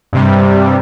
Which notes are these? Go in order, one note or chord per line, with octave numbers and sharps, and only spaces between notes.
G2 C3 G3